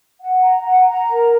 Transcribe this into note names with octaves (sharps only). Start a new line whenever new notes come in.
F#5
A#5
F#5
A#5
A#4